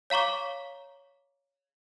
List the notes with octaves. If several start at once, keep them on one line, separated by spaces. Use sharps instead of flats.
C#5 F5 A#5 C#6 D6